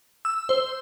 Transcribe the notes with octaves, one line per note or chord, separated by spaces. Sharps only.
E6
C5